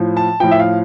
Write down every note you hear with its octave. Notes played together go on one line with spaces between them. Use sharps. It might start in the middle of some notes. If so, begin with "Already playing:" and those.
Already playing: A2 F3
A5
A2 F3 G5
E5
F5